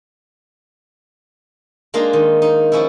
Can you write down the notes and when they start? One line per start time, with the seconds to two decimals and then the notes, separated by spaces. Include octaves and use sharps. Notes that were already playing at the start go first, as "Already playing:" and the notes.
1.94 G#3 A#3 D4 D#4 F4
2.13 D#3
2.42 D#4
2.72 F3 C#4 E4